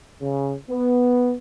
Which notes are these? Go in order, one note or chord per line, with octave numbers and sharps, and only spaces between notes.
C#3
B3